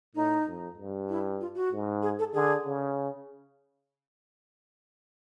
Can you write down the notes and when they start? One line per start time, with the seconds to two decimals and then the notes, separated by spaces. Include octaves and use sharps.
0.15 A2 D#4
0.47 F2
0.78 G2
1.09 E4
1.41 F4
1.56 F#4
1.72 G#2
2.02 G#4
2.19 A4
2.34 D3 G#4
2.65 C#3